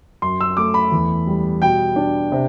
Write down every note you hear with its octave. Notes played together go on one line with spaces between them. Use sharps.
F#2 C6
E6
A3 D6
B5
E2
G3
B2 G5
D4
C3